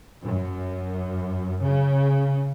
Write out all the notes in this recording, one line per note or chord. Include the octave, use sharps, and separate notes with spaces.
F#2
C#3